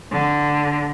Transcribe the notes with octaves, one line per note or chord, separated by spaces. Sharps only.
D3